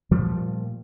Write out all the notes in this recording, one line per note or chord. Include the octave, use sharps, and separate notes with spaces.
A#2 F3 G3 A3